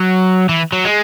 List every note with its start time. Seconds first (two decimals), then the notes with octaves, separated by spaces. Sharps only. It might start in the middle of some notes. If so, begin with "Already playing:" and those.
Already playing: F#3
0.49 E3
0.72 F#3
0.85 G#3